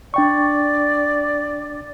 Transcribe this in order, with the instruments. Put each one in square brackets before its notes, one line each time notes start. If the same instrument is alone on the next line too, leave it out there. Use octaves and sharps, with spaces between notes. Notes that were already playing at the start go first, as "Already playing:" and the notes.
[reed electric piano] D4 G5 C#6 [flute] D5